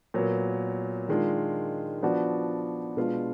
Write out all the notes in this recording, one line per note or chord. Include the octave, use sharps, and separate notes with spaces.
A#2 F#3 B3
D#3 G#3 D4 F4
F3 B3 D4 F#4 D5
B2 G#3 D4 F4 B4